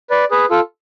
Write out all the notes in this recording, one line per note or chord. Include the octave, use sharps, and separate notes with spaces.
B4 D5
G#4 B4
F4 A4